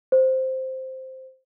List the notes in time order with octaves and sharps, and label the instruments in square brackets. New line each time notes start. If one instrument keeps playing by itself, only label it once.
[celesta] C5